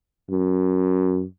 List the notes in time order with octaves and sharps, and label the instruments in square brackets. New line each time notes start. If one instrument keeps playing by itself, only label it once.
[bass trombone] F#2